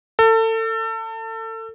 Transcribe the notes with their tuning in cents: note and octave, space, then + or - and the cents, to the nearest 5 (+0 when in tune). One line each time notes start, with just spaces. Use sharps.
A4 +30